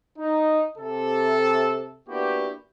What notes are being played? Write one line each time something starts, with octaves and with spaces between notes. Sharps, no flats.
D#4
C3 A4
A#3 B3 D4 E4 F#4 G4